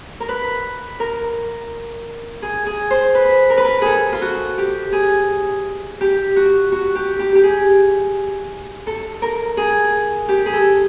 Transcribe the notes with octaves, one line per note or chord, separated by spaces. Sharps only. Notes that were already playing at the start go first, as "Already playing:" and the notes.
A#4
B4
A#4
G#4
G#4
C5
B4
A#4
B4
A#4
G#4 A4
F4
F#4
G4
G#4
G4
F#4
F#4
G4
G4
G4
G#4
A4
A#4
G#4
G4
G#4
A4